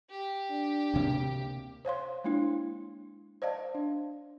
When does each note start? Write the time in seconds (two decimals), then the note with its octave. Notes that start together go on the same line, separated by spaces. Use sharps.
0.11 G4
0.51 D4
0.94 D2 C3 A#3
1.85 C5 C#5 F5 C6
2.24 G#3 A#3 D4 E4
3.42 C5 D5 D#5 F5 A5
3.75 D4